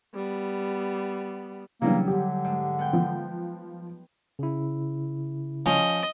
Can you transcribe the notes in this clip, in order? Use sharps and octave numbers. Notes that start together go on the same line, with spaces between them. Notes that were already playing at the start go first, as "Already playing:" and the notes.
G3 B3
C#3 E3 F#3 G3 A#3 D4
D3 G4
G#2
B3 G5
F3
C#3 E4
F3 C#4 D#5